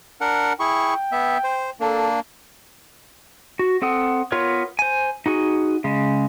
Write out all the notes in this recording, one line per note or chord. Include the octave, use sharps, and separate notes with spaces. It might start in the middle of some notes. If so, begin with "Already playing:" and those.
D4 A#4 F#5
E4 G#4 G5 C#6
B3 E5
C5
A#3 D4 A4
F#4
C4 A4 F#5 D#6
B3 F4 A#4 C#5
C5 G#5
D#4 F#4 G#4
C#3 G#3